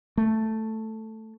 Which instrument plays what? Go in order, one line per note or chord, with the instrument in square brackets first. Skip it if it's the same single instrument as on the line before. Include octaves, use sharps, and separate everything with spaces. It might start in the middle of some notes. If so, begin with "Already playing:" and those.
[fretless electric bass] A3